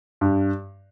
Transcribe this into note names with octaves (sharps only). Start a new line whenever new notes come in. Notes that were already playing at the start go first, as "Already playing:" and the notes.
G2